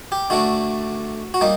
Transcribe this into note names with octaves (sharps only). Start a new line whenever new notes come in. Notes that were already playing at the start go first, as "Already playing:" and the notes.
G4
D3 A3 D4 F#4
F#4
G3 A#3 D#4